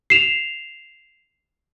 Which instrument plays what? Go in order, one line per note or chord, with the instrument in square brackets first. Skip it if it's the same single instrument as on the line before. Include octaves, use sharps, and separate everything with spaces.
[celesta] C7 E7 F7